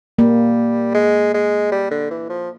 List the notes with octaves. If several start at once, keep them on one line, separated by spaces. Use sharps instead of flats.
G3 A#3
G#3
G#3
G3
D3
E3
F3